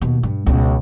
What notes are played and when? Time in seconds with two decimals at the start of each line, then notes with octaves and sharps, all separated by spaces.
0.01 D#2 B2
0.23 G2
0.46 C#2 B2